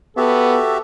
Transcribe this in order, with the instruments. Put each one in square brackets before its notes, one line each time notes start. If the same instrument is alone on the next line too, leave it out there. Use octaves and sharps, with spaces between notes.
[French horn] B3 [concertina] F#4 G4 E5 [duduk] A4